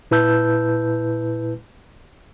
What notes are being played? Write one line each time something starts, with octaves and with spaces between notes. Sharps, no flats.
A#2 E4 B4 A5 E6 G6